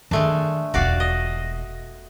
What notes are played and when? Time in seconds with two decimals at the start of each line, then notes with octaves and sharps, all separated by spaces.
0.11 D#3 G#3 A3 D4
0.74 E1 F4 F#4 D5 F5
1.00 D#5